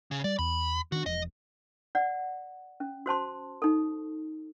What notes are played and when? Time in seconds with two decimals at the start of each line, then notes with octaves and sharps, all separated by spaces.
0.11 C#3
0.24 G3 D5
0.39 E2 B5
0.92 D#3 B3 D4 F#4
1.06 E1 F3 D#5
1.95 D5 F#5
2.80 C#4
3.06 F#4 C5 A5 C6
3.62 D#4 A4